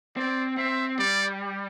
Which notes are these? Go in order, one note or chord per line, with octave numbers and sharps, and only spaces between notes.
C4 D5
C4 E5
G3 D5